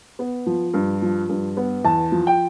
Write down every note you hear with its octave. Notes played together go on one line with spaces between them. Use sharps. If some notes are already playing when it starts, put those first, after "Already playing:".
B3
F3
G2
F3
G2
B3
E2 A5
F3
G5